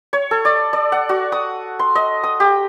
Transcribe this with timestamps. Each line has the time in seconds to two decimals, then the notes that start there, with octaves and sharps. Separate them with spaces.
0.13 C#5
0.31 A4
0.45 D5
0.73 D5
0.92 F#5
1.09 F#4
1.32 D#6
1.79 C6
1.95 D#5
2.23 D#6
2.40 G4